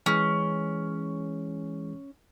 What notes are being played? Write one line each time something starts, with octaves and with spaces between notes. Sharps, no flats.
E3 G#3 C#4 G#4